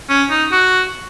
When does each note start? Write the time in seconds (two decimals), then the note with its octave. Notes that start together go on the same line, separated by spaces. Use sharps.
0.09 C#4
0.30 D#4
0.52 F#4